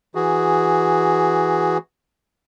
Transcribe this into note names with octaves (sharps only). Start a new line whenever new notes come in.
E3 F#4 G#4